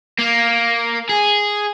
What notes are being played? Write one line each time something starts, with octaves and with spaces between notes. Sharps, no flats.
A#3
G#4